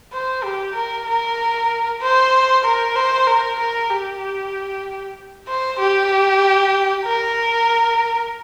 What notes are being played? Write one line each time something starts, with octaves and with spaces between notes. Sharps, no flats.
C5
G4
A#4
A#4
C5
A#4
C5
A#4
A#4
G4
C5
G4
A#4